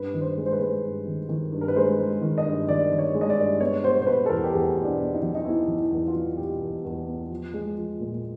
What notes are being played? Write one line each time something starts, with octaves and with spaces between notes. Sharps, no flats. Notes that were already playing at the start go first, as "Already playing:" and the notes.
Already playing: G2 B4
D#3
C5
G#3
C5
B4
G#3
G2
D#3
D#3
G2
A#4
B4
G#3 C5
G#3
D#3
D#5
G2
D#3 D5
D#3
C#5
G#3
D#5
D5
G2
B3 C#5
B2 C5
C5
B2 B4
A4
E2 A#4
G4
E2 G#4
B2
D4
B3
D#4
F#3
D#4
B3 E4
F#3
E4
E2
F4
F#3
B2 G4
E2
E2
B3
F3
G#3
F3
A#2